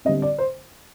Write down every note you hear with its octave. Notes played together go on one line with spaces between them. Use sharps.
D3 G3 C4 D#5
D5
C5